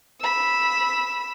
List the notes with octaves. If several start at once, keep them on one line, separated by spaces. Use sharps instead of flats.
B5 E6